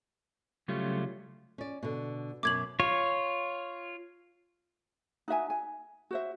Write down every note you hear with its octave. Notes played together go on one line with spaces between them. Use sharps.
C#3 F#3 G3 A3 C#4 F4
C#4 D5
B2 D3
F#2 B2 F#3 D6 G#6 F#7
F4 C#5
D#4 F#4 E5 G#5
G#5
F#4 C5 E5